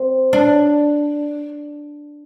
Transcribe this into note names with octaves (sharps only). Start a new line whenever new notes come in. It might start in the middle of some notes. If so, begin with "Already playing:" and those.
Already playing: C4
D4